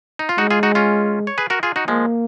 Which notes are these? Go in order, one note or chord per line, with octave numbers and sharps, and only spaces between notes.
D#4
F4
G#3 D#4 F#4
F4 G#4
D#4 F#4
C#4 F4
C#5
G#4 B4
F#4 A#4
F4 G#4
D#4 F#4
F3 G#3 A#3